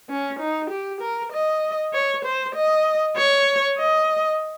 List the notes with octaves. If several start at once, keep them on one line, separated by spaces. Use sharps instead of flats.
C#4
D#4
G4
A#4
D#5
C#5
C5
D#5
C#5
D#5